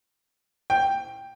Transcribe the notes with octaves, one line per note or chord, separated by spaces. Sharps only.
G5